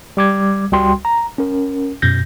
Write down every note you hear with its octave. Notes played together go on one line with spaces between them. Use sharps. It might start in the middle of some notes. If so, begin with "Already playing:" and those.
G3 D6 G#6
C#2 G3 F#4 G5 C6
A#5
C#4 A#4
F#2 B2 G6 A#6